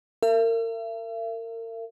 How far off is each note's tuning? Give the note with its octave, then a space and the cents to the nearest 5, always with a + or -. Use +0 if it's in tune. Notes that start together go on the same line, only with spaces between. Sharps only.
A#4 -35 E5 +40